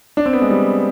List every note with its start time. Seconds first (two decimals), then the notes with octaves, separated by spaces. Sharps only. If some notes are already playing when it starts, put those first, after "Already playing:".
0.17 D4
0.26 C4
0.33 B3
0.41 G#3
0.50 G3